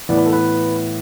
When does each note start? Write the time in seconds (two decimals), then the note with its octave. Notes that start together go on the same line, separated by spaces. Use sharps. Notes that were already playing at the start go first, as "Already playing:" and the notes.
0.09 A2 E3 B3 D5
0.17 B4
0.26 A4
0.33 B4